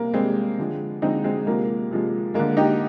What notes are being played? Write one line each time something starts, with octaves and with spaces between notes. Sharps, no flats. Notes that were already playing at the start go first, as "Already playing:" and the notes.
Already playing: C3 G3 A#3
C3 G3 G#3 C4
D3 F3 G#3
D3 F3 G#3 C4 D#4
G#3 C4
C3 F3 G#3 A#3
C3 F3 G#3
D3 G#3 A#3
D#4 G4